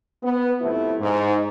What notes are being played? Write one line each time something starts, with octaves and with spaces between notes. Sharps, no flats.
B3
C3 F3 A3 E4
G#2